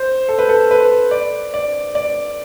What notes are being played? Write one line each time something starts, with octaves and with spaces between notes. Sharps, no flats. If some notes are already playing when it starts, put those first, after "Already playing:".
Already playing: C5
A4
B4
A4
B4
D5
D5
D5